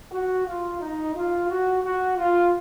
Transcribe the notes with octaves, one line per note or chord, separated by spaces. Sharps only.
F#4
F4
D#4
F4
F#4
F#4
F4